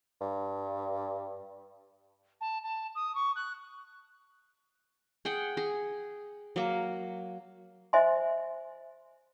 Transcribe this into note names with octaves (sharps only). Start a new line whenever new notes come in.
G2
A5
A5
D#6
C#6
F#6
G#4 F#5 G5
G#4
F#3 A#3
C5 D#5 E5 G#5 C6